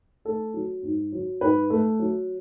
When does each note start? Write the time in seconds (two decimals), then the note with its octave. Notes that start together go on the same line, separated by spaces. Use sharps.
0.25 A3 A4
0.54 F#3
0.83 G#2
1.12 F#3
1.41 G#2 B4
1.70 A3
1.99 F#3